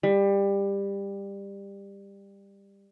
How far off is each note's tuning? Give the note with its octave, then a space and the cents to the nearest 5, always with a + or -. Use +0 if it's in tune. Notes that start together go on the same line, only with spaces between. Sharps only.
G3 +20